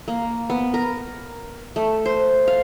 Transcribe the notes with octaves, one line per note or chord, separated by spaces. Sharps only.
A#3
B3
A#4
A3
C5
F5